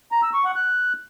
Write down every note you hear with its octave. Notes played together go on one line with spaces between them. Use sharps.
A#5
E6
C#6
F#5
F#6